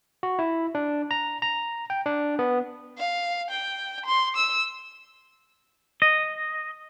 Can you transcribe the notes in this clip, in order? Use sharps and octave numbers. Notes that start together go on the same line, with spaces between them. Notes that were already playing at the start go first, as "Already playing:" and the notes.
F#4
E4
D4
A#5
A#5
G5
D4
B3
F5
G5
C6
E6
D#5